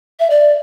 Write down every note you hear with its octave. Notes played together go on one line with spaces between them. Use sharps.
E5
D5